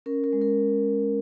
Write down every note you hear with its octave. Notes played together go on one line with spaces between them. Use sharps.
C#4 A#4
A#4
G#3
A#4